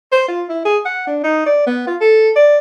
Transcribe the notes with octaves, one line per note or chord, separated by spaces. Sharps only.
C5
F4
E4
G#4
F#5
D4
D#4
D5
B3
F4
A4
D5